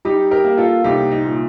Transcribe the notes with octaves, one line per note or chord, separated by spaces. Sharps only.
G3 D#4 G4
G4 A#4
A#3
F4 A4
C2 D#4 G4
D#4
A#2